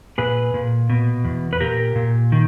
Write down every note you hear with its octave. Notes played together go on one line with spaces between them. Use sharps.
A#2 G#4 B4
A#2
B2
E2
B4
A#2 G4 A#4
A#2
D#3